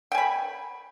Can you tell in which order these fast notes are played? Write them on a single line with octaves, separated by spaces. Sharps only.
G5 G#5 B5